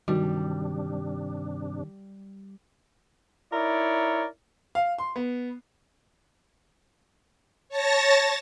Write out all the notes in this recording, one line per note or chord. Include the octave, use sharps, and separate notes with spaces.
G2 C3 D#3 G3 D4 F#4
D#4 E4 A#4 C#5 D5
F5
C6
B3
C#5 A5 A6 A#6